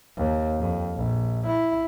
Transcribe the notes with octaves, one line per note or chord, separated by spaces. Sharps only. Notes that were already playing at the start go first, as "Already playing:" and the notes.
D#2
F2
A#1
E4